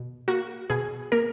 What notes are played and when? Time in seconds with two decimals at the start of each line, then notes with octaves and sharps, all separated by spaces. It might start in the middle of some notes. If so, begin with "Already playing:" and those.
Already playing: B2
0.28 A#3 F#4
0.70 B2 G#4
1.12 A#3 A#4